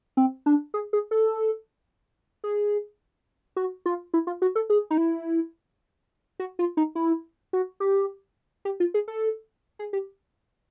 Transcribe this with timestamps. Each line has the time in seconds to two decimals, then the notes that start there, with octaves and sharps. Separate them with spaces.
0.17 C4
0.46 D4
0.74 G#4
0.93 G#4
1.11 A4
2.44 G#4
3.56 F#4
3.86 F4
4.14 E4
4.27 F4
4.42 F#4
4.56 A4
4.70 G#4
4.90 D#4
4.98 E4
6.39 F#4
6.59 F4
6.77 D#4
6.95 E4
7.53 F#4
7.80 G4
8.65 G4
8.80 F4
8.94 G#4
9.08 A4
9.79 G#4
9.93 G4